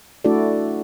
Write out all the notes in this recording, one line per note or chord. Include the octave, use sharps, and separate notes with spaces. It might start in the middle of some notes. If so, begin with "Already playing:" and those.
A3 D4 E4 F#4 A4 D5